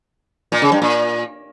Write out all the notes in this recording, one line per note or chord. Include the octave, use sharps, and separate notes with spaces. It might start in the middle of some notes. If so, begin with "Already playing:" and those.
A#2
C#3
G2
A#2